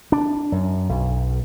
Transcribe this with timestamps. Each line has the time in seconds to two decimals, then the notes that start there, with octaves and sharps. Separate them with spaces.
0.12 D4
0.52 F#2
0.89 B1